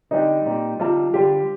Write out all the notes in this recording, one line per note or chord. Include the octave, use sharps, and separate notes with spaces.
D3 G3 C4 D#4
A#2 G3 C4
D3 G3 C4 D#4 F4 A4
D3 G3 D4 F4 G4 C5